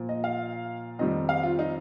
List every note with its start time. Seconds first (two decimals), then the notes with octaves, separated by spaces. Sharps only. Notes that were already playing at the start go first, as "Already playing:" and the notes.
Already playing: A#2 F3
0.09 D#5
0.24 F5
0.99 F2 D#3 G3 D#5
1.29 F5
1.43 F4
1.59 D#4